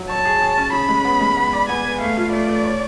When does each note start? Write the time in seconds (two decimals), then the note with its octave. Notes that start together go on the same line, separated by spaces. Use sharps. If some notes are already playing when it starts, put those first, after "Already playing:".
Already playing: F#3
0.09 C#5 A5
0.25 G#4
0.41 G#4
0.57 C#4
0.73 C#3 B5
0.89 G#3
1.05 B3
1.20 G#3
1.37 B3
1.53 D5
1.69 B3 G#5
1.85 B4
2.01 A3 F5
2.17 F4
2.33 A3 D5
2.49 A3
2.64 C#5